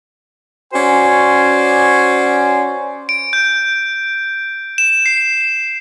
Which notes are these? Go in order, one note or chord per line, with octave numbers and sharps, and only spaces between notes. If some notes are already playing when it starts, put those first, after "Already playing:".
C#4 F#4 C5 D5 G#5
D7
G6
E7
C7